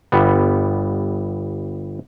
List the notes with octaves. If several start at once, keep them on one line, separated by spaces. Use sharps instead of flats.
G1 G3 B3